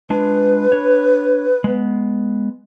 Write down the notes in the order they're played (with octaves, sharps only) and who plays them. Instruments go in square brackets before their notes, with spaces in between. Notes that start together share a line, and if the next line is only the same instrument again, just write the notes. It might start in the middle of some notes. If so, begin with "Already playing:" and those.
[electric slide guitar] G#3 D4 F4 [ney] B4
[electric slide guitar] D4 C#5
G#3 B3